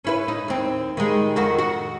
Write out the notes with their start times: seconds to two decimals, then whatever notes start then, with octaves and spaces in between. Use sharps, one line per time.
0.05 C#4 E4 B4
0.28 D#4
0.48 D#2 C4
0.97 D#3 G3 G#3
1.36 F2 D#3 F#4
1.58 F#4